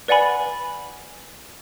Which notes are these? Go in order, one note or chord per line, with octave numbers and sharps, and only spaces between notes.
B4 D5 F#5 G#5 B5